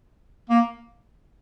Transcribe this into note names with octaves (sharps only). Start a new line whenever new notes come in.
A#3